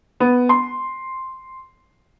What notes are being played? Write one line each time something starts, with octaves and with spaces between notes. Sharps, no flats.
B3
C6